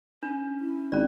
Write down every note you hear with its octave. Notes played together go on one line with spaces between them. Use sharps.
C#4 D4
E4
G#1 C#4 D5